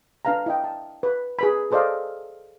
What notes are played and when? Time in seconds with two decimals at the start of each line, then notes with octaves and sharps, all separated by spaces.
0.25 D4 B4 F5 A5 A#5
0.46 E4 D#5 G5
0.64 A5
1.03 B4
1.39 G#4 B4 B5
1.71 G#4 A4 C5 D5 D#5 F5